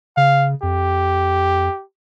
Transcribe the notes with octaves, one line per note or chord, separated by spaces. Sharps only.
C#3 F5
F2 G4